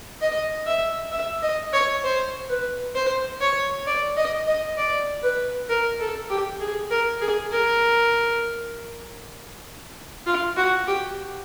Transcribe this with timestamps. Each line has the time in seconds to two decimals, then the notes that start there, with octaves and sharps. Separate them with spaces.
0.21 D#5
0.67 E5
1.12 E5
1.43 D#5
1.73 C#5
2.04 C5
2.50 B4
2.95 C5
3.41 C#5
3.87 D5
4.17 D#5
4.47 D#5
4.78 D5
5.23 B4
5.69 A#4
6.00 A4
6.30 G4
6.61 G#4
6.91 A#4
7.21 G#4
7.52 A#4
10.26 F4
10.57 F#4
10.87 G4